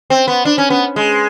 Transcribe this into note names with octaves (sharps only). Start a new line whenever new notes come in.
C4
B3
D4
C#4
B3
G#3